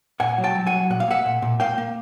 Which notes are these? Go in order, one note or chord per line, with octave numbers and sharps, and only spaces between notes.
A#2 F#5 G#5
F#3
G5 A5
F#3
F#5 G#5
F#3
A#2 F#5
F5
A#3 E5 F#5
A#2
A#2
A#3 F5 G5
A#3